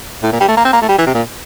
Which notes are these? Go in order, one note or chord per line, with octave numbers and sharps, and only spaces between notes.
A2
A#2
G3
A3
A#3
C4
A#3
A3
G3
E3
C3
A#2